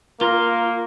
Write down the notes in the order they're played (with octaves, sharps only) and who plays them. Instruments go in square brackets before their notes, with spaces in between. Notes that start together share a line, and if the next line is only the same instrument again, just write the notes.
[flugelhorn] A#3 [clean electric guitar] F4 [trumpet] A#4